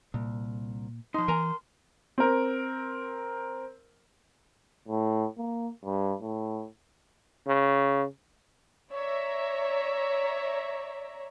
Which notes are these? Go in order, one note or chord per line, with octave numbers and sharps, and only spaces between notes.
C2 A#2
F3 D#4 C6
E3 A#4 G#5 A#5
C4 A#4
A2
A#3
G2
A2
C#3
C#5 D5 E5 A#5